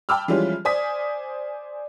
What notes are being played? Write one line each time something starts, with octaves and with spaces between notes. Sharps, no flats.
G5 A5 B5 D6 E6 F6
E3 F3 G3 G#3 C#4 F4
C5 D5 G#5 D#6 B6